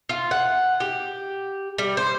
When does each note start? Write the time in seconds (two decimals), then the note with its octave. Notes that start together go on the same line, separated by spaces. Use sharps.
0.09 F4
0.31 F#5
0.80 G4
1.78 G3
1.97 C5